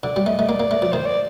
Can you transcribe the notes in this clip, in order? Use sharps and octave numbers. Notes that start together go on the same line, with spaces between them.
D3 D5
G3
A3 D#5
A3
A#3 D5
A#3
A3
F3
D#3 C5
D5